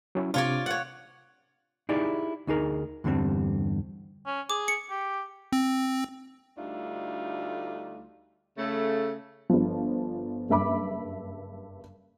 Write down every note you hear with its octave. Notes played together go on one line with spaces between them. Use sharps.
F#3 C#4 E4
C3 D4 F4 C#5 D5
C#5 F#5 F#6
D#4 E4 G4 G#4 D5
D2 D#4 G#4 A#4
E2 G2 D3 G3 C4
C#4
G#4 D6
C#7
G4
C4
D2 G3 A3 D4 D#4 F4
C#3 A3
G1 F3
F#1 G2 E5 B5 D6